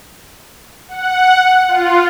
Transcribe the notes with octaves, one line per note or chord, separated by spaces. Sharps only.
F#5
F4